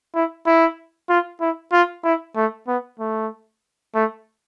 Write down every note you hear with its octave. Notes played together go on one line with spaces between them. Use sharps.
E4
E4
F4
E4
F4
E4
A3
B3
A3
A3